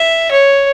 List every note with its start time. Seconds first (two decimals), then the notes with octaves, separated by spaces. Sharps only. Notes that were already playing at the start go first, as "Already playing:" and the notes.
Already playing: E5
0.31 C#5